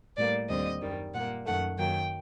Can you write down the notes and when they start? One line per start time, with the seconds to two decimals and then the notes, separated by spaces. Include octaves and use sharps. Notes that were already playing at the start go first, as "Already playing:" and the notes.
0.17 A2 G3 A#3 D5
0.49 D#2 D3 G3 C4 D#5
0.81 F#2 D#3 G3
1.14 A#2 G3 A#3 F#5
1.45 F#2 D#3 A3 F#5
1.78 F#2 D#3 F#3 A#3 G5